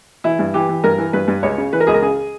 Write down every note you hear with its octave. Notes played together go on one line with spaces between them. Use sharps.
E3 E4
G2
E3 G4
E3
G2 A#4
E3
G2 B4
G2
C#2 C#5
C#3
E3 B4
A#4
C#2 G#4
A#4
C#3 G#4